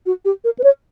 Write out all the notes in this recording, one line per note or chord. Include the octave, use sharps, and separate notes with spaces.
F#4
G4
A#4
B4
C#5